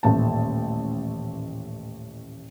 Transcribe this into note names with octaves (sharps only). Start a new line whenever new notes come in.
D#1 A1 A3 A5